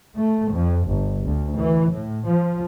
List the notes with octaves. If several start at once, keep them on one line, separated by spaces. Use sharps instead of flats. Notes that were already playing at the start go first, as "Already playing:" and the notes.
A3
F2
G1
D2
E3
A2
F3